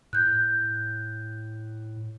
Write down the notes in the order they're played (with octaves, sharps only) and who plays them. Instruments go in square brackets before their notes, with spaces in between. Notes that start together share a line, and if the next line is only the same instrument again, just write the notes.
[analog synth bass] A2 [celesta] F#6 G6